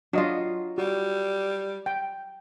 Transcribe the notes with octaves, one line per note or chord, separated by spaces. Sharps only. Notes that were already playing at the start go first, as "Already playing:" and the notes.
F#3 D4 F4 D#5 F5
G3 F#4
G5